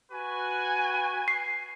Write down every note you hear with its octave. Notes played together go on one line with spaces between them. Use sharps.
F#4 B4 G#5
C7